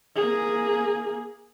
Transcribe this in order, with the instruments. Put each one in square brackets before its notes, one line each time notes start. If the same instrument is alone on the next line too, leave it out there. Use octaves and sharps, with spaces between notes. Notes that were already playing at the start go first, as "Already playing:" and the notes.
[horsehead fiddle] A#3 G#4